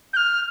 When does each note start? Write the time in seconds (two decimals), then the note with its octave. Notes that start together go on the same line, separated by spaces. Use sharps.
0.13 G6
0.17 F6